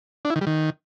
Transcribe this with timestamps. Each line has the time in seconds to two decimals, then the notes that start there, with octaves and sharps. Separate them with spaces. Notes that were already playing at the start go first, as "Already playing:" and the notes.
0.25 D4
0.30 E4
0.36 D#3
0.41 G3
0.47 D#3